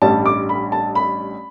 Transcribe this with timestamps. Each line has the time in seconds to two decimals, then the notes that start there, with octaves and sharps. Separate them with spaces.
0.02 A1 G2 G3 A5
0.26 D6
0.49 B5
0.72 A5
0.95 B5